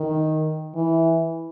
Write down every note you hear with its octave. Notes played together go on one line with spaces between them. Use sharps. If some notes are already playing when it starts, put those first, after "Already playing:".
Already playing: D#3
E3